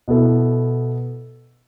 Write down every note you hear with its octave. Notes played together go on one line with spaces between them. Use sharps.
B2 B3 E4 A4